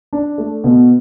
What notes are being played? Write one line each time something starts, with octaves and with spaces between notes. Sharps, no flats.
D4
A3
B2